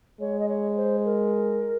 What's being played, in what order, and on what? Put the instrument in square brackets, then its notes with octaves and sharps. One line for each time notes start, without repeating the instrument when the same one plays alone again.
[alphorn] G#3 [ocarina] C#5
[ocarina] D#5
C#5
C5
A#4